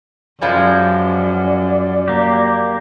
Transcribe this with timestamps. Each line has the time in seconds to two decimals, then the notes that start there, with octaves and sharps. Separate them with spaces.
0.41 F#2 F3 G3 G#3 D5
2.08 A#3 G4